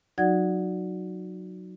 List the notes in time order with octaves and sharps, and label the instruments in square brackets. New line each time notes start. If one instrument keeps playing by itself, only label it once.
[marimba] F#3 D#4 F#4 D5 F#5 G#6